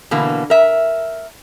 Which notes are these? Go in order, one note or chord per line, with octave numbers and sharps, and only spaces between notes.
B2 D3 E3 A#3
A#4 E5